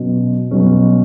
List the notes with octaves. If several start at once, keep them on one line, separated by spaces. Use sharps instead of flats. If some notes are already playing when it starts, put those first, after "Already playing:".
Already playing: B2 F#3 C#4
B2 F#3 C#4